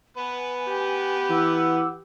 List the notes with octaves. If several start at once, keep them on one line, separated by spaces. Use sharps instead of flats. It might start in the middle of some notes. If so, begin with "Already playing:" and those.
B3 B4 G#5
G4
E3 F#5 D6 E6